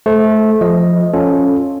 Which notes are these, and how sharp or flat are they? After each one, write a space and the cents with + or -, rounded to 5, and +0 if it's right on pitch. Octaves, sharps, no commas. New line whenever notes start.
A3 -20 C5 +0
F3 +0 D#5 +0
C#4 +0 F4 +0 A4 -5